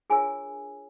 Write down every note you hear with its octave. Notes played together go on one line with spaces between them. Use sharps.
D4 F4 G#4 A#4 C#5 G#5